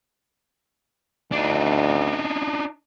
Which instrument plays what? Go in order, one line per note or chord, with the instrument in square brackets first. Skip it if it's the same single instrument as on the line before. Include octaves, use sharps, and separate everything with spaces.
[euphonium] D2 [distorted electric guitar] D4 D#4